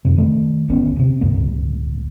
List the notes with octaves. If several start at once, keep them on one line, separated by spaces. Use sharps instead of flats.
F2 C3
D#3 A3
G1 D2 B3 C#4
A1 C3
D1 C#2 G2 A#3